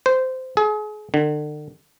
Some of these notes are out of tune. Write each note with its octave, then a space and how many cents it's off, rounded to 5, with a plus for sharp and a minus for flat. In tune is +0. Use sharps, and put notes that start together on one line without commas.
C5 -15
G#4 +35
D3 +35